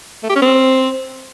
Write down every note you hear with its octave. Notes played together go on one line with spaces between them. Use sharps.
A3
G4
C#4
C4